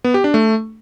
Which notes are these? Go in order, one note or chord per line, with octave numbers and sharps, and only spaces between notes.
B3
G4
D4
A3